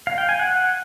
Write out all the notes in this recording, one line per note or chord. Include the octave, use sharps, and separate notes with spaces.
F5
G5
G#5
F#5